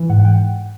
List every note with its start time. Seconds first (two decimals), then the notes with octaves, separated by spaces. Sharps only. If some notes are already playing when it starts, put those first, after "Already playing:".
Already playing: E3
0.09 G#2 F#5
0.20 F#5
0.25 G5